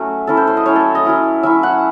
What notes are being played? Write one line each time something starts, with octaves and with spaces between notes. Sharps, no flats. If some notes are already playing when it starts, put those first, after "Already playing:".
Already playing: F#3 A3 C#4 F#4
F#3 C#4 E4 A4
C5
C5
D#5
F#3 C#4 E4 C#5
A4
D#5
F#3 C#4 E4
F#3 C#4 E4 E5
F#5